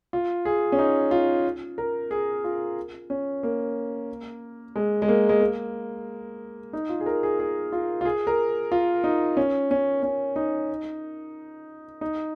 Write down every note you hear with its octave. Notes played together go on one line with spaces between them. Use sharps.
F4
G#4
C#4
D#4
F4
A#4
G#4
F4
C#4
A#3
G#3
G#3
A#3
G#3
A#3
D#4
F4
G#4
A#4
G#4
G#4
F4
F4
G#4
A#4
F4
D#4
C#4
C#4
C#4
D#4
D#4